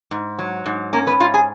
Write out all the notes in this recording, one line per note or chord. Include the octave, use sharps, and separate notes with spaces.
G#2
F#3
G#2
A#3 C#4 A#4
B3 B4
G#2 F4 F5
G#4 G#5